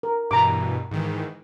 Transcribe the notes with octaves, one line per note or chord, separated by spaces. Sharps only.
A#4
G2 B2 E3 A#5 D6
G#2 D#3 E3